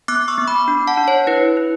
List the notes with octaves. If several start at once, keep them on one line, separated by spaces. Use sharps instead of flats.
B3 D6 F#6
C#6 E6
B3
B5 D6
D4
F#5 A5
D4
C#5
E4 B4
E4